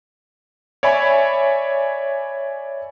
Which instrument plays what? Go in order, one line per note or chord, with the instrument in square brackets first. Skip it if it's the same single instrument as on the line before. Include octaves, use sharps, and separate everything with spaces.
[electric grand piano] C#5 D5 E5 G#5 B5